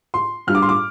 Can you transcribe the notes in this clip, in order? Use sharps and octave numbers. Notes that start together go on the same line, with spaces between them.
C6
G2 G3 F6
D6
C6
D6